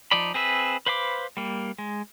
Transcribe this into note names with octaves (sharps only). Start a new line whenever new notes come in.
F3 D#4 D5 B5
C4 G#4 B4 E5
B4 C5 F5 B5 D6
G3 A#3
G#3